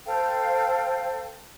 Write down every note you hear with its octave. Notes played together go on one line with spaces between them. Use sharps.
A4 C5 F5 G5